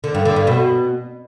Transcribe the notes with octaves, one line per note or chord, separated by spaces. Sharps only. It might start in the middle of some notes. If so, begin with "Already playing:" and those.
D3
G2
D3
G2
B2